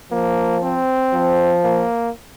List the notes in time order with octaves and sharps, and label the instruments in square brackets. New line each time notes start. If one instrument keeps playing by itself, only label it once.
[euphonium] F3 [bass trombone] A#3
[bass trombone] C4
[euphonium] F3
[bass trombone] A#3